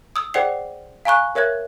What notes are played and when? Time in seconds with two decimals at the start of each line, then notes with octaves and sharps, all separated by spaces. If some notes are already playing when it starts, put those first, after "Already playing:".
0.16 D#6 E6
0.34 G#4 C5 D5 F#5 G5 C7
1.05 F5 G#5 A#5 C#6 F#6
1.35 A#4 C#5 E5 F#6 G#6